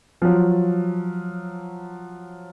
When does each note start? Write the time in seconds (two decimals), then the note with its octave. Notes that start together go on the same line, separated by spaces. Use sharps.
0.22 F3 F#3